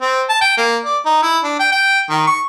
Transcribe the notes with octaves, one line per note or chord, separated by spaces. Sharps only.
C4
A5
G5
A#3
D5
D#4
E4
D4
G5
G5
D#3
C#6